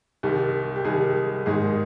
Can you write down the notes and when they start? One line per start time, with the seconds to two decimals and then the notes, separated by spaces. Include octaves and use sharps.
0.23 C2 C3 D#3
0.76 G4
0.85 C2 C3 D#3 G#4
1.46 G#1 G#2 D#3 G#4